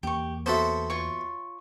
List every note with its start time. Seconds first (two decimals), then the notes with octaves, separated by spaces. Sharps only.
0.03 E2 A#3 G4 C#6
0.46 B3 F#4 A4 C5 E5
0.90 F4 C#5 C#6